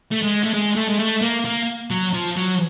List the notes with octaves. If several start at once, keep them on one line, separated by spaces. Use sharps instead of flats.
A3
G#3
A3
G#3
A3
G#3
A3
A#3
A#3
F#3
F3
F#3